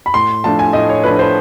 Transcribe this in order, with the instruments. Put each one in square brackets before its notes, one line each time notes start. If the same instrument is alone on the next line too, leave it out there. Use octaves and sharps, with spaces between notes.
[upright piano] B5
A2 C6
F3 A3 D4 A5
G#5
A2 D#5
C#5
F3 A3 D4 B4
C5